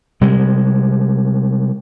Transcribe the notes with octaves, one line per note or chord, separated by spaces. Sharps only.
C3 G3 G#3